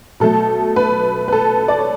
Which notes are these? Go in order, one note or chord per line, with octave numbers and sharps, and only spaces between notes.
B2 F#3 A3 A4
B4
B4
A4
D5
C#5